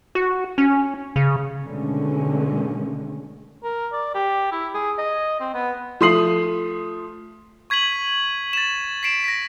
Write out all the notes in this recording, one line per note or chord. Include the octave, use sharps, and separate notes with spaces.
F#4
C#4
C#3
B2 D3 D#3 G#3 A3 C#4
A#4
D5
G4
E4
G#4
D#5
C4
B3
F3 A3 C6 D#6 C7 F#7
C#6 G#6 B6 D#7 F#7
A6 E7
B6 C7 D7 E7
A#6 B6